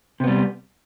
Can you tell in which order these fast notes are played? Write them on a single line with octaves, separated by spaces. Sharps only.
C3 B3 G3